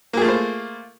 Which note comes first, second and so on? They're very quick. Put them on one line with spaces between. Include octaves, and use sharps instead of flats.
A#3 G#4 A3 F4 C5